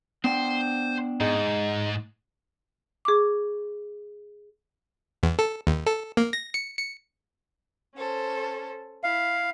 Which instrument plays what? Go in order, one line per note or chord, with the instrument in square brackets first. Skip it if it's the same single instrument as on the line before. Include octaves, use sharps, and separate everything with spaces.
[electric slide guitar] B3 D4 G5 [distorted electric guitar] C5
[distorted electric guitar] G#2 [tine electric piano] G#3 D#4
[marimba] G#4 C#6 D6
[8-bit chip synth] E2
A4
D#2
A4
A#3
A#6
C#7
C#7
[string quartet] C#4 A4 C5
[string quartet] E4 [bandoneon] F5